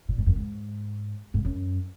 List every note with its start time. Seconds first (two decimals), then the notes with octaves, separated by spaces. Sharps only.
0.09 A#2
0.18 G#2
0.26 F#2
0.36 G#2
1.34 G#2
1.45 F#2